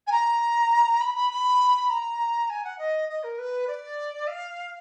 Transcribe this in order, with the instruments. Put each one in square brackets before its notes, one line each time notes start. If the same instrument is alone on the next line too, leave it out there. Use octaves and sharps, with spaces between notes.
[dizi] G#5
A#5
B5
B5
B5
A#5
G#5
F#5
D#5
D#5
A#4
B4
D5
F5